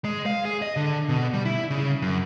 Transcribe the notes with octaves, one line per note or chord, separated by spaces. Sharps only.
G#3
F5
G#4
D#5
D3
B2
G3
E4
C#3
F#2